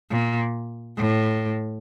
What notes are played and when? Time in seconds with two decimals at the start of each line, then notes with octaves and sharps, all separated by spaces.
0.10 A#2
0.97 A2